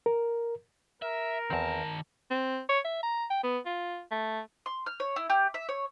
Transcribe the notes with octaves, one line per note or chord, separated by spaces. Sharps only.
A#4
A#4 E5
E2 D#3 C4 A5
C4
C#5
E5
A#5
G5
B3
F4
A3
C6
F6
C#5
E4
G4
E5
C#5